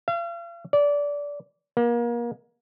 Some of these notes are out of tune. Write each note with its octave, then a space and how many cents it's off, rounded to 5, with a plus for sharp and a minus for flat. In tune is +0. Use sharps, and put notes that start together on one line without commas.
F5 -40
D5 -20
A#3 +30